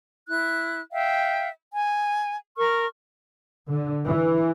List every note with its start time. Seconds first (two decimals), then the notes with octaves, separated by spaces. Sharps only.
0.27 E4 F#6
0.91 E5 F5 G5
1.73 G#5
2.58 A#4 C#6 F6
3.69 D3
4.05 E3